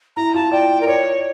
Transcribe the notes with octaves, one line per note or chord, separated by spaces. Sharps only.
E4 A#5
F4 A5
D5 G5
A#4
C#5 D5